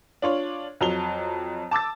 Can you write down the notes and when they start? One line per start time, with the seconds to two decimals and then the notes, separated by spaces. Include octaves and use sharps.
0.22 D4 F4 C#5
0.81 F2 F#3 F7 G7
1.71 A5 D6 E6 A6